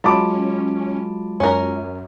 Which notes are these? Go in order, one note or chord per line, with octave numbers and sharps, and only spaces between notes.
F#3 G#3 C#4 F4 A5 B5 D6
F#2 C#4 A#4